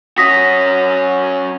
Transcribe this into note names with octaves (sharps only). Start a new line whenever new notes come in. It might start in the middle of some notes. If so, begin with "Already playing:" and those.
C#4 F#4 D#6 A#6 B6